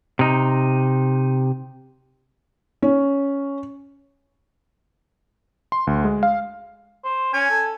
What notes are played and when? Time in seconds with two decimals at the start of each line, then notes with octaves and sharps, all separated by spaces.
0.19 C3 D#4
2.82 C#4
5.72 C6
5.87 D2
6.04 G#3
6.23 F5
7.04 C5
7.34 C#4 G#5
7.50 A4